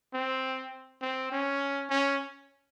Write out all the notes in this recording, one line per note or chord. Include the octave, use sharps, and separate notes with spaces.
C4
C4
C#4
C#4